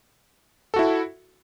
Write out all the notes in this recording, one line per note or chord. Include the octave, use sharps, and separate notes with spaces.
E4 F#4 A4